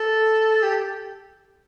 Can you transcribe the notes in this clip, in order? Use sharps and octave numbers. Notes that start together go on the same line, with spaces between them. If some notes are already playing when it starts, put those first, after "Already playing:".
Already playing: A4
G4